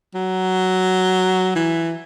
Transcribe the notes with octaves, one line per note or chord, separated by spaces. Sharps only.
F#3
E3